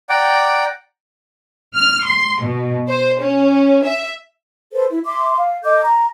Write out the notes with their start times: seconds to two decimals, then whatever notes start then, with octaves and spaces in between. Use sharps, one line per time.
0.09 D5 F#5 G5 A#5 D6
1.75 F6
2.05 C6
2.42 B2
2.89 C5
3.20 C#4
3.84 E5
4.72 A4 B4 C5
4.90 E4
5.05 E5 C6 D6
5.37 F5
5.64 A4 D#5 D6 G6
5.83 A#5